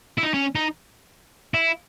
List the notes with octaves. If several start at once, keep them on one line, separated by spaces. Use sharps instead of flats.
E4
D#4
C#4
D#4
E4